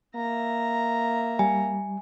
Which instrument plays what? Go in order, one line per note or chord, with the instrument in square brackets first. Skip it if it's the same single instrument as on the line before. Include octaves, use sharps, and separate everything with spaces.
[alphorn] A#3 [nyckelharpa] E5 A#5
[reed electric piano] G3 [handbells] G#5